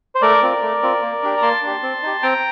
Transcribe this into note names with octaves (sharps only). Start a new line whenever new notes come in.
C5
A3 A#4 D5
C4 F4
A3
C4 F4
A#3
D4 G4
A#5
A#3 A5 C6
D4 G4
C4
D#4 G4
C4 G5 A#5